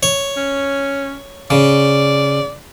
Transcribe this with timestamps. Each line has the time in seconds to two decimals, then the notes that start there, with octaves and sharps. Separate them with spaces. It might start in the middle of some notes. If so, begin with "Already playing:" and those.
0.03 C#5
0.37 C#4
1.51 C#3 D5